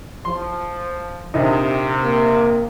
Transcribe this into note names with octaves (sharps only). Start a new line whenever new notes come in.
F3 C6
A#1 C3 D#4
A#3